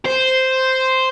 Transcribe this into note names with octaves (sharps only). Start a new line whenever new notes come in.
C5